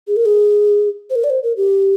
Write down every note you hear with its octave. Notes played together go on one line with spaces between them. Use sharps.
G#4
A#4
G#4
C5
A#4
D5
C5
A#4
G4